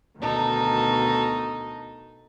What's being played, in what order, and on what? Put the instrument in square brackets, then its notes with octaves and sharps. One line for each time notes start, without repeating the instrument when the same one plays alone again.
[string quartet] D2 B2 D#3 D#4 A4